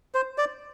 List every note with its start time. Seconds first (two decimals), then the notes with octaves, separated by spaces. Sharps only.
0.15 C5
0.38 D5